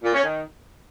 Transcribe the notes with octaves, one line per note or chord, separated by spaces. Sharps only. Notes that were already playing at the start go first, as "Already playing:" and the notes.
A#2
C#4
D#3